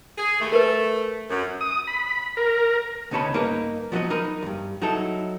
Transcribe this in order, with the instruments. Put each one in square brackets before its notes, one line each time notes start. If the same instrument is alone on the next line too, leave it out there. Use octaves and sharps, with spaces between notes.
[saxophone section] G#4
D#2 A3
[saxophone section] A3 [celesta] A#4 B4
[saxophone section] F#2
[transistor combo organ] D#6
B5
A#4
[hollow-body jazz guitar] D2 C#3 D#4 C#5 A5 B5
G2 A#3 D#4 B4 A#5
F3 F#3 B3 D#4 F#4 D#5
D#4 A#4 D#5 B5
E2 G2
F#3 D#4 E4 A4